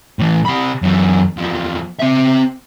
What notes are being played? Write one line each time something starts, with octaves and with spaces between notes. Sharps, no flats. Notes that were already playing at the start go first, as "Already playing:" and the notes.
A2 E3
C3 B5
F#2 E3
E2 F3
C4 E5